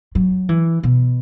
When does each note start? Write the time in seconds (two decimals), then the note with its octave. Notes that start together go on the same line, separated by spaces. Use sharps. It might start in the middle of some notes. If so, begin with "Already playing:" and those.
0.15 F#3
0.49 E3
0.83 B2